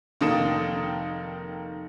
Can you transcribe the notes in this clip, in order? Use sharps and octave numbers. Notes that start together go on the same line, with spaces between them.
F1 D#3 A#3 A4 D#6 E7